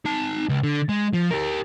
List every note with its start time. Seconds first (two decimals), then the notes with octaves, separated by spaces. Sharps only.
0.05 D#4 A5
0.49 C#2
0.64 D3
0.89 G#3
1.13 F3
1.31 G4 A#4